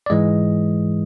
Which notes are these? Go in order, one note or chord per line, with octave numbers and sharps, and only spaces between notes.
D5
G#2 E3 G#3 D#5